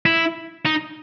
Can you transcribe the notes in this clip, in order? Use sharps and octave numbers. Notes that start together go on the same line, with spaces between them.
E4
D#4